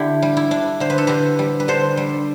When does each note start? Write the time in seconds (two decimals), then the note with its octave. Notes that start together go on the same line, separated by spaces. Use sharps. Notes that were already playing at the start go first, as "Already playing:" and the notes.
Already playing: D3 E4 G4
0.22 G3
0.37 E4
0.51 D4
0.80 D3 C5
0.90 B4
0.98 A4
1.07 D3 G4 B4
1.39 G3
1.60 B4
1.68 D3 A4 C5
1.97 G3